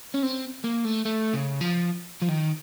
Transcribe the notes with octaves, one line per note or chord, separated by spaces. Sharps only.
C#4
C4
A#3
A3
A3
C#3
F3
F3
D#3